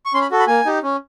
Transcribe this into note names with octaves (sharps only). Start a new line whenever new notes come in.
C#6
C#4 C6
B5
F#4 A4
B5
A#3 G#5
D#4 G4
C#4